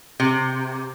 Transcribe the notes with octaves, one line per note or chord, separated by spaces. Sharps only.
C3